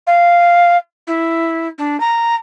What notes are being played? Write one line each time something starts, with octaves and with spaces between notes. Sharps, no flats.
F5
E4
D4
A#5